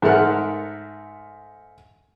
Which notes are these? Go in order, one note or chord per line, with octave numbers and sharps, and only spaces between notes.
G#2 A3 A#4 F#5 F6